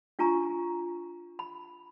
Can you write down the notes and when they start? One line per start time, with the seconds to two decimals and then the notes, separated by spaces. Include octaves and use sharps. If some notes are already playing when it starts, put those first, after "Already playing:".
0.19 D4 F4 G#5 A#5 C#6
1.39 B5